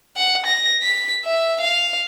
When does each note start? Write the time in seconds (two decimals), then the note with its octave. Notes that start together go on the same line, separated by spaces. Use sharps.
0.17 F#5
0.46 A#6
0.82 B6
1.25 E5
1.61 F5